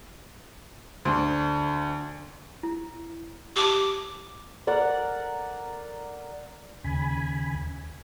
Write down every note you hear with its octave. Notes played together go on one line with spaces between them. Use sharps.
D2 D4 C5
E4
G4 A5 D6
A#4 D5 F#5
D#2 C#3 G#5 B5